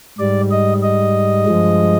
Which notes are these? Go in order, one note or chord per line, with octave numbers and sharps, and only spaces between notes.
G#2 G3 D5
D#5
D#5
G2 F3 G#3